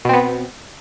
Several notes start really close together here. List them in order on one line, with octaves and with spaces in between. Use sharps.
B2 C4 B3